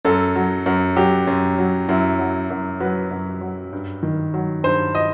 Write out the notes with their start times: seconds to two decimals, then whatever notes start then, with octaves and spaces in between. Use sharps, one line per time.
0.05 F#2 A4
0.35 F#3
0.66 F#2
0.96 F#3 G4
1.27 F#2
1.58 F#3
1.88 F#2 E4
2.19 F#3
2.50 F#2
2.80 F#3 B4
3.11 F#2
3.41 F#3
3.72 G2
4.03 D#3
4.34 F#3
4.64 G2 C5
4.95 D#5